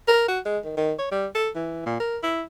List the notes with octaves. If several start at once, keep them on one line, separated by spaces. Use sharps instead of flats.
A#4
F#4
G#3
D#3
D#3
C#5
G3
A4
E3
A#2
A#4
E4